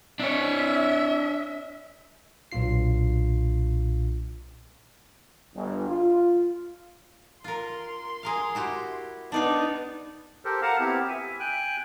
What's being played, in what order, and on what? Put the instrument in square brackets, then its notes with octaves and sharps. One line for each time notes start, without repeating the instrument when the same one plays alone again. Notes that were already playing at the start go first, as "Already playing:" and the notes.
[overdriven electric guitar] D4 C#5 [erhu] E5
[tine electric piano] B1 A#2 D4 F4 C7
[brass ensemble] G1
F4
[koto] F4 A#4 [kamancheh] C6
[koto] G#4 A#4 F5
E4 F#4 G4
[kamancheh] B3 D#4 [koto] D4 D5 F5
[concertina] G4 A4 A#4 C5
A#4 F5 F#5 A5 A#5
B3 C4 E4 G4
E5 G#5
G5 G#5 F#6